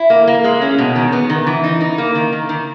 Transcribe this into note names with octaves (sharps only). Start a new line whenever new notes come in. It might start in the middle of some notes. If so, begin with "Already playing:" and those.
Already playing: E4
A#3
A#3
G#3
C#4
B2
D#3
B3
D#3
E3
D#4
D#4
A#3
D#3
D#3
D#3